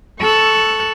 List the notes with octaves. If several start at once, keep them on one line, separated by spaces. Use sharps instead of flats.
A4 C#6 E6 F#6